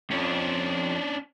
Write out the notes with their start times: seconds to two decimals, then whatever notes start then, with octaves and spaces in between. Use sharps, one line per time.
0.11 F2 C#4 D4